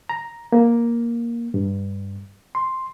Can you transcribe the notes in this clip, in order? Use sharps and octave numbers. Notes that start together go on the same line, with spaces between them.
A#5
A#3
G2
C6